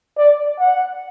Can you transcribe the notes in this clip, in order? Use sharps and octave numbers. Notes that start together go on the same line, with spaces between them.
D5
F#5